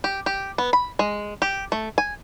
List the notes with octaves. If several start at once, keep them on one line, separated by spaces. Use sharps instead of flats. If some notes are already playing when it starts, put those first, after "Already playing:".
G4
G4
B3
B5
G#3
G4
A3
G#5